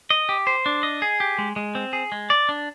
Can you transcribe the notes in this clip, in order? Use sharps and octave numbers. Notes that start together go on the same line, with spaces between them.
D#5
G4
C5
D4
D#5
G#4
G4
G#3
G#3
C4
G#4
G#3
D5
D4